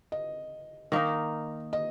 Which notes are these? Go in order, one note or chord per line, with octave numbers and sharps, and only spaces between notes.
D#5
D#3 A#3 D#4
D#5